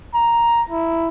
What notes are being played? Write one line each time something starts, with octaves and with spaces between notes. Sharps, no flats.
A#5
E4